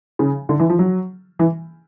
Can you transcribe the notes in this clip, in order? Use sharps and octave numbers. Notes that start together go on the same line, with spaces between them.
C#3
D3
E3
F3
F#3
E3